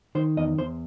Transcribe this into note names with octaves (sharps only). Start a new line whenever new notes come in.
D#3 C5
E2 D#5
E2 C5